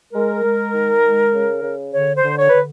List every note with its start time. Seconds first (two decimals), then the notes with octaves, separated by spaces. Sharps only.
0.13 G#3 A#4
0.43 G#3
0.73 D#3
1.03 G#3
1.32 C#3
1.62 C#3
1.92 D3 C#5
2.16 C5
2.22 D3
2.37 C#5
2.49 D3 B4